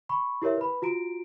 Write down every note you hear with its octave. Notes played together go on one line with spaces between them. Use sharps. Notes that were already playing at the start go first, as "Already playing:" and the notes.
B5 C#6
E4 G4 A#4 C#5 E5
B4 B5
F4 F#4 A#5 D7